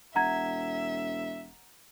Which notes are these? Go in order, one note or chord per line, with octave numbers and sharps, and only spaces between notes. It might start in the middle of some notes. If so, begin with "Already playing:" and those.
E1 E5 F#5 A#5 G#6